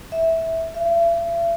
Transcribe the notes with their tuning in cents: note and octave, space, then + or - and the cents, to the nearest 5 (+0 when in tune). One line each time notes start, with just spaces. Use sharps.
E5 -10
E5 +45